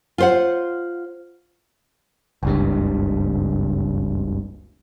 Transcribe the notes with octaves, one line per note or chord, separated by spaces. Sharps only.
F4 C5 F#5
F#1 C#2 G2